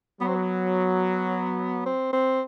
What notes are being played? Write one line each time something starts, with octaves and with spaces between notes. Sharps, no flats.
F#3 B3
C4
B3
C4
C4